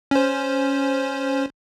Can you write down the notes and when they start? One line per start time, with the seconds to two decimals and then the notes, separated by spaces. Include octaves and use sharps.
0.11 C#4 C5